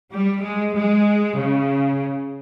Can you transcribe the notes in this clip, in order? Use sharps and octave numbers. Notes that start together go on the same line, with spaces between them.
G3
G#3
G#3
C#3